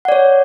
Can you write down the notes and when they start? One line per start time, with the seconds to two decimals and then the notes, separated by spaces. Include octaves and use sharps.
0.05 F#5
0.08 D5
0.12 C#5